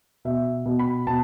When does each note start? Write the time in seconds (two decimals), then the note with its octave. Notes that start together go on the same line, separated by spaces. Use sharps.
0.25 B2 E5
0.66 B2
0.79 B5
1.07 B2 A5